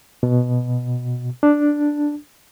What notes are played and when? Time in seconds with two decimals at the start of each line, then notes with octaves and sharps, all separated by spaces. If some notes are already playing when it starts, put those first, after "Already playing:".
0.23 B2
1.43 D4